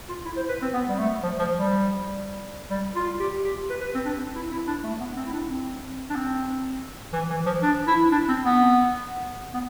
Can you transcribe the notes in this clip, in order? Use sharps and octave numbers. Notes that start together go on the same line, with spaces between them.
F4
E4
C5
B4
C4
B3
G3
A3
F3
F3
G3
G3
F4
G4
G4
B4
B4
C4
D4
C4
E4
E4
D4
A3
B3
C4
E4
D4
C4
D4
C4
E3
E3
F3
D4
E4
D4
C4
B3
B3